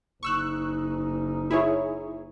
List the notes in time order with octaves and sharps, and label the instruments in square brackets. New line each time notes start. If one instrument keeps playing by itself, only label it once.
[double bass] F#1 D#4 [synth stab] C#6 E6 F#6
[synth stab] E4 G#4 C#5